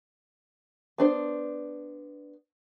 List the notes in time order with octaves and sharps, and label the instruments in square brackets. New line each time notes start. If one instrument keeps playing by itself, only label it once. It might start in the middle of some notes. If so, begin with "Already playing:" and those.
[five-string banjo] B3 D4 C5